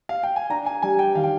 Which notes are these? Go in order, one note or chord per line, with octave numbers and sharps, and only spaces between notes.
F5
G5
G#5
D4 A#5
G#5
G3 G#5
G5
D#3 F5
G5